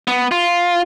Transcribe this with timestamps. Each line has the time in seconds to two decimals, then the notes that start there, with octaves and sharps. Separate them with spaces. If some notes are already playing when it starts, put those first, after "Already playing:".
0.08 B3
0.32 F4